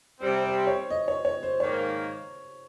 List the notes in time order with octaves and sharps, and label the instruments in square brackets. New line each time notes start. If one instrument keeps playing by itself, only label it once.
[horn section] C3 G3 C4 [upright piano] C5
[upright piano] C5
C#5
D#5
C#5
C#5
C5
[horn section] G#2 D#3 A#3 [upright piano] C#5